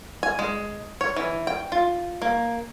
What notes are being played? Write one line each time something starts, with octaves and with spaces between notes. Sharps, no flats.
G#5
G#3
C#5
E3
G5
F4
A#3